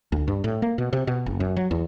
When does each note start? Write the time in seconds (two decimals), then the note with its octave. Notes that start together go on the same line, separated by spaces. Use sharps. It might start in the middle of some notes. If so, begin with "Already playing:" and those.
0.12 D2
0.28 G2
0.44 A2
0.62 A#3
0.78 B2
0.93 C3
1.07 B2
1.26 F#1
1.40 F#2
1.57 F#3
1.71 E2